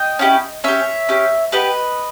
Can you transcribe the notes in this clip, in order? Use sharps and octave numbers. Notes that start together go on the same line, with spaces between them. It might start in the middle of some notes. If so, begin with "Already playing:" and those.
Already playing: D#5 G5
C#4 E4 G4
C#4 G4 C#5 E5
C#4 G4
B3 G4 B4 D#5